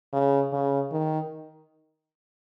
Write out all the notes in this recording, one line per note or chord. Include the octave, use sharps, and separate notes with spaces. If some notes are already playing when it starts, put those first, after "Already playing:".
C#3
C#3
D#3